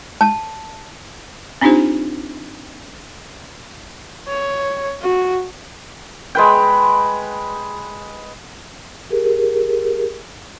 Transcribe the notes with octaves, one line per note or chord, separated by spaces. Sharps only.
A5
C4 D4 D#4 F4 G4 C5
C#5
F#4
G#3 B4 G5
G4 G#4 A#4